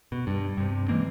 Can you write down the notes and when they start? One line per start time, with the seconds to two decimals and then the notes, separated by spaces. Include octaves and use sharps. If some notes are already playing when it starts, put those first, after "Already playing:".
0.12 B2
0.27 G2
0.57 G2 C3
0.88 E3 G#3 A#3 C4